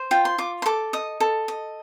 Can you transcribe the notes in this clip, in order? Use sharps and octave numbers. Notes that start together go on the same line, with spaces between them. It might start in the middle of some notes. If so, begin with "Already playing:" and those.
Already playing: C5
F4 G5
C6
F4 D6
C6
A4 D6
D#5 D#6
A4
D#5